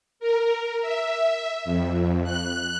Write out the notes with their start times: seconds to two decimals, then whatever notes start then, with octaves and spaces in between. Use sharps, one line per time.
0.20 A#4
0.81 E5
1.65 F2
2.24 F#6